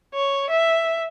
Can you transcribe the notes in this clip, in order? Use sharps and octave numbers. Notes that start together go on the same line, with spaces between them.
C#5
E5